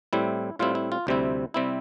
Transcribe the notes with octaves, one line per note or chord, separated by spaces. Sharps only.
A2 G3 C4 E4
A2 G3 C4 E4 F4
E4
F4
D2 C3 G3 C4 E4
C3 G3 C4 E4